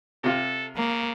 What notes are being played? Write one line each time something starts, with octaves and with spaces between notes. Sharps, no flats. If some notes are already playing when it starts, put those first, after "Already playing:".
C3 F4 A4
C#3 A#3